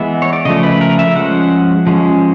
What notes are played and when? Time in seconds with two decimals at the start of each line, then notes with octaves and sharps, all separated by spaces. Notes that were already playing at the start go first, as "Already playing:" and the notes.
Already playing: E3 G#3 B3 E5
0.22 C#5
0.33 D5
0.45 C#3 F3 A3 D#5
0.63 B4
0.81 A#4
0.99 E5
1.16 F3 G#3 C#4 F#5
1.87 F3 G#3 C#4